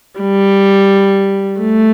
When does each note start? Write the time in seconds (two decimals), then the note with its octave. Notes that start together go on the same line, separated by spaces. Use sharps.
0.20 G3
1.60 A3